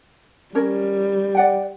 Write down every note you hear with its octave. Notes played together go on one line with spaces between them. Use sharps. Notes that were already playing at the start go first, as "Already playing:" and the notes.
G3 C#4 A#4 C#5
D5 F#5 G5